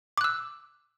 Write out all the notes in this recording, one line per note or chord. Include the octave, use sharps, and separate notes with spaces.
D6 E6 F#6